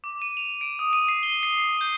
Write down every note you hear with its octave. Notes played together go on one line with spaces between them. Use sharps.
D6
D#7
F7
D7
D#6
D#7
C7
G7
C7
G6